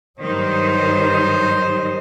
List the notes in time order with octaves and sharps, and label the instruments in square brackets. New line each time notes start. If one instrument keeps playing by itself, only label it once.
[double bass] G2 F#3 [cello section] D#3 G3 D#4 [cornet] C5